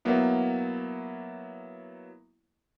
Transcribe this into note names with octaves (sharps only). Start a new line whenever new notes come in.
F#3 A#3 B3 E4